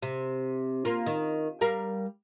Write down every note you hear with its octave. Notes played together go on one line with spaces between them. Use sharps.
C3
A#3 F4
D#3
G3 A#4 F5